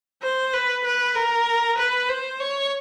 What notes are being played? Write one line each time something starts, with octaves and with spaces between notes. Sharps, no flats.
C5
B4
B4
A#4
B4
C5
C#5